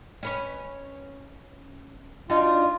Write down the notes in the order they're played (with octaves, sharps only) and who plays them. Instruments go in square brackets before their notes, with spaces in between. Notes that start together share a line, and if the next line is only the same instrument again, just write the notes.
[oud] C#4 B4 C#5
[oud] D4 D#4 F#4 [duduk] F4